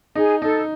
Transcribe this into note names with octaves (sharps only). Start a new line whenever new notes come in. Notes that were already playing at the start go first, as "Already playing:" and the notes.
D#4 G#4
D#4 A4